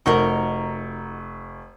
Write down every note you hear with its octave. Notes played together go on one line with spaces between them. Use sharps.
F1 D#4 F#4 A#4 C#6